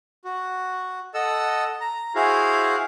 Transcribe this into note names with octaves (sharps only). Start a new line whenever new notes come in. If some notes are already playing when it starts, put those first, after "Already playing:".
F#4
A4 D#5 F#5 E6
A#5
E4 F#4 G#4 C5 F5